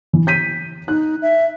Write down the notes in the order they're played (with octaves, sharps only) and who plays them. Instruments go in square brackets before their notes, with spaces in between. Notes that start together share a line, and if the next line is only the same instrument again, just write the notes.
[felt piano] E3
G6 B6 D#7
[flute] D#4 [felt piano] F#6
[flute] E5